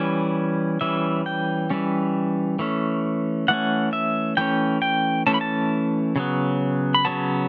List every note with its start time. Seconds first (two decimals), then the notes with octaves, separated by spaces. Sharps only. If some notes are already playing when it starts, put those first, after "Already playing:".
Already playing: E3 G3 C#4
0.81 E3 G3 C#4 E5
1.26 G5
1.70 E3 G3 C#4
2.59 E3 A3 C#4
3.48 E3 A3 C#4 F#5
3.93 E5
4.37 E3 A3 C#4 G5
4.82 G5
5.27 E3 A3 C#4 A5
5.34 B5
5.41 A5
6.16 C#3 F#3 B3
6.95 B5
7.05 C#3 F#3 B3 A5